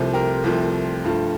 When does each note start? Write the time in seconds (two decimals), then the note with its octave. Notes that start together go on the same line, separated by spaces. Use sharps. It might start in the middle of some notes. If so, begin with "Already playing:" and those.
Already playing: C2 C3 F3 A3 A4 C5
0.13 G4 A#4
0.44 C2 C3 F3 A3
1.04 G2 F3 A3